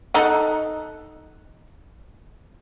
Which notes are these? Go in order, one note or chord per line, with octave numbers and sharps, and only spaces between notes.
D#4 A4 F#5